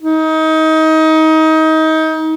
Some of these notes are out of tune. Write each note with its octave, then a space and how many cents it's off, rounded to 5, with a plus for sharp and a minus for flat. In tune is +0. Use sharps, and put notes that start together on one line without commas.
D#4 +25